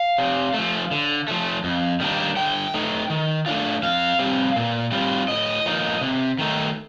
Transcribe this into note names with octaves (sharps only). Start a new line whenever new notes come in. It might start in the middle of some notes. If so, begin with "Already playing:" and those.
Already playing: F5
C3
F3 A3
D3
F3 A3
F2
D#3 G3 A#3 D4
D3 G5
A3 D#4
D#3
A3 D4 F4
F2 F5
C3 G3 C4
A#2
G3 C4 F4
A2 D#5
F3 A#3 D#4
C3
D#3 A3 D#4